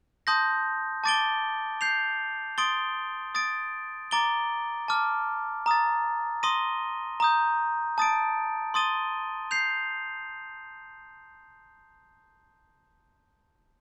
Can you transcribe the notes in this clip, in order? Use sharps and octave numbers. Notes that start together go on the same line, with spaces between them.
A5 C6 D#6 G6 A#6
A5 D6 A6 D7 G7
G6 C7 F7
C6 D#6 A6 D7 G7
D#6 A6 D7
A#5 D6 A6 D7 G7
A5 D6 F6
A#5 D#6 A6
C6 D#6 A#6 D#7 G7
A#5 D#6 G6
A5 D#6 A6 D7
C6 D#6 A6 D#7 G7
G6 C7 F7